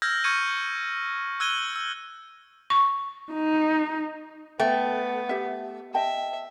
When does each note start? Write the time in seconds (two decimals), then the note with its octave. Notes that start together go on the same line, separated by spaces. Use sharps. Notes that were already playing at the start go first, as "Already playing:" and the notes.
0.02 E6 F6 G6 G#6 A#6
0.24 C#6 F6 G6 G#6 C#7 D#7
1.40 E6 F#6 G#6 D#7 G7
1.76 E6
2.70 C#6
3.33 D#4
4.60 A3 B3 G5
5.29 G4 E5
5.94 D#5 E5 G5 A5